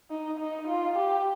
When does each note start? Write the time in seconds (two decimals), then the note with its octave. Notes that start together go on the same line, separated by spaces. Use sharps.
0.10 D#4
0.39 D#4
0.68 F4
0.96 G4